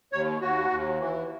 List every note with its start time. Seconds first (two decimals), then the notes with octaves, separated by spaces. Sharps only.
0.13 D#2 C#5
0.41 D#2 F#4
0.70 D#2
0.99 E3